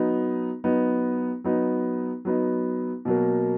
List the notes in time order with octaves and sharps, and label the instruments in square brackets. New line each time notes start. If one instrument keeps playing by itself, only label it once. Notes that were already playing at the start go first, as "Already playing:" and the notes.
Already playing: [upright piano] F#3 B3 D#4
F#3 B3 D#4
F#3 B3 D#4
F#3 B3 D#4
B2 F#3 A#3